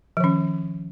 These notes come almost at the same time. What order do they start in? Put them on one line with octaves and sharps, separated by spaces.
F3 D#3 C#4